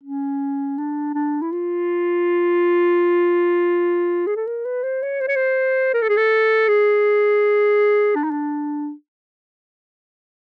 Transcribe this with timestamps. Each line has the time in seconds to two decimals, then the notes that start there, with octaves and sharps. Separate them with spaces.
0.04 C#4
0.78 D4
1.14 D4
1.42 E4
1.52 F4
4.27 G#4
4.36 A4
4.47 A#4
4.65 B4
4.83 C5
5.02 C#5
5.20 C5
5.28 C#5
5.36 C5
5.94 A#4
6.02 A4
6.09 G#4
6.17 A4
6.68 G#4
8.15 D4
8.24 D#4
8.31 D4